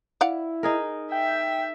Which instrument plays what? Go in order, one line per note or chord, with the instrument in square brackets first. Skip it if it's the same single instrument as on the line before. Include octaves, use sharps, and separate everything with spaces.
[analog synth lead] E4 [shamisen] D5 F5 F#5
[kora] D#4 G#4 A#4
[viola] E5 [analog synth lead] G5